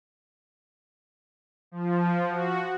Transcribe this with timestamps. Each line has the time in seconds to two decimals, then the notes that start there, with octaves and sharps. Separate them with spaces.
1.71 F3
2.29 F#4